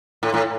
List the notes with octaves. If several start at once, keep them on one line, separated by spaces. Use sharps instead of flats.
A2
A2